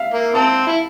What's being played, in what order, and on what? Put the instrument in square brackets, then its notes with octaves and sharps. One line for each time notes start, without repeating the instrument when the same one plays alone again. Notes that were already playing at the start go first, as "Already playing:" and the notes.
Already playing: [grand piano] E5 F5
[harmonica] A#3
[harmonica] C4 [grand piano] A5
[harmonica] E4